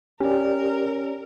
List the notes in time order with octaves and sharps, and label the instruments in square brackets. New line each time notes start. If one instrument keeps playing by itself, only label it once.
[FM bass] C#4 [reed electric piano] G4 D5 [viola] A#4